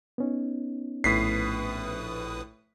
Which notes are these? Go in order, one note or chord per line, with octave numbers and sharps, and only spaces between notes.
B3 C#4 D#4
A#1 A2 B4 D#6 B6 C7